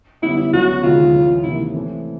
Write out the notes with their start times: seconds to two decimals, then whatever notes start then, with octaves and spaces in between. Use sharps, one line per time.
0.22 F#2 D3 G3 B3 E4
0.37 E4
0.53 C#2 C#3 F#3 B3 D4 F#4
0.83 D2 C3 D#3 G#3 F4
1.14 F#2 C#3 E3
1.43 C3 D#3 F#3 A#3 E4
1.74 E3 A3 C4